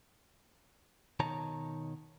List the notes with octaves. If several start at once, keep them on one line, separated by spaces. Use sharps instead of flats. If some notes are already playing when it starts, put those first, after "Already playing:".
B2 D#3 C#5 A5 A#5